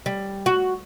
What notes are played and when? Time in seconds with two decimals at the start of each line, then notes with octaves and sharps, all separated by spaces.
0.06 G3
0.46 F#4